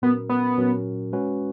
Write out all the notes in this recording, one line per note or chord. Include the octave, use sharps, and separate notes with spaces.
A#2 F#3 B3 C#4 F#4 A#4
B3
A#2 F#3 C#4 F#4 A#4
G#3 C#4 F#4 B4